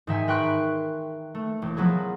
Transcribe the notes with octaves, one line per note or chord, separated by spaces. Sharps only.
G#2 D#3 E5 G#5
A#4 B4 G5 C6 C#6 F#6
A3
E1
F3 F#3 B3 G#4